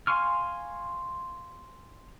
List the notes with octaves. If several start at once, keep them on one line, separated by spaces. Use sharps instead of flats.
F5 G#5 C6 C#6 F6